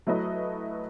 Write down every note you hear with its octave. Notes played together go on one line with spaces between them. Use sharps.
F#3 A3 E4 B4 D#5